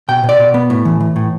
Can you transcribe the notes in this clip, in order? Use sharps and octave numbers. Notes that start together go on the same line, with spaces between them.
B2 G5
B2
D5
B2
B3
A2
E3
E3
A2